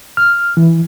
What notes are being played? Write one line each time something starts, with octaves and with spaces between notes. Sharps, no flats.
F6
E3